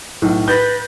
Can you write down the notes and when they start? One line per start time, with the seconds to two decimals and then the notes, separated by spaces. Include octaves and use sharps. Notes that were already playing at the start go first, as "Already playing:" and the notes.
0.22 B1 A2
0.48 B4 G6 A6 A#6